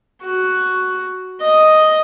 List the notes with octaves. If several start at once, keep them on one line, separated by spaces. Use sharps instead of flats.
F#4
D#5